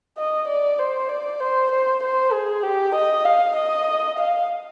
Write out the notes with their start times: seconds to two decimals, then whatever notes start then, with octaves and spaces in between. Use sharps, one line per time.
0.18 D#5
0.48 D5
0.79 C5
1.09 D5
1.40 C5
1.71 C5
2.03 C5
2.33 G#4
2.63 G4
2.95 D#5
3.25 F5
3.56 D#5
4.18 F5